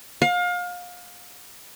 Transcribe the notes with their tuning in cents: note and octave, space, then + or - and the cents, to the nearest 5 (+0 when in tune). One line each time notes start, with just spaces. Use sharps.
F5 +30